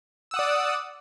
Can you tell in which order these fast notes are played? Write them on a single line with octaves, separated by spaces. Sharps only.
E6 F#5 D#6 D5